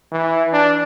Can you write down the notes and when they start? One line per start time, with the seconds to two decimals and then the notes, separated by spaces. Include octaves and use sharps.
0.12 E3
0.53 D4